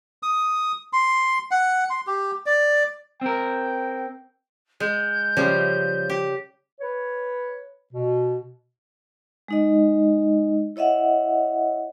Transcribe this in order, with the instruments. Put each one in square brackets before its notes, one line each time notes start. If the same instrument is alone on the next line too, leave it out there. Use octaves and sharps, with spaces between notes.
[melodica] D#6
C6
F#5
C6
G4
D5
[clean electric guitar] C4 A#4 [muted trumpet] G5
[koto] G#3 [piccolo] G6
[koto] C#3 F3 G3
G4
[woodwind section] B4 C#5
B2
[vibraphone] G#3 D#4 D#5
E4 C#5 D#5 E5 F#5